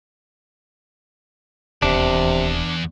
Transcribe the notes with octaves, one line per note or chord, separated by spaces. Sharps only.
D#1 E2 C3 D4